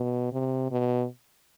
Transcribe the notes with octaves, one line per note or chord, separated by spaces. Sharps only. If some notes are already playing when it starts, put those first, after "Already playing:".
Already playing: B2
C3
B2